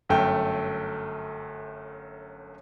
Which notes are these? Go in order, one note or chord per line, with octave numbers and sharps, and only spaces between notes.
G1 F#2 A3 G5